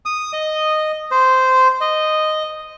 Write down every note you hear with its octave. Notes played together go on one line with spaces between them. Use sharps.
D#6
D#5
C5
D#5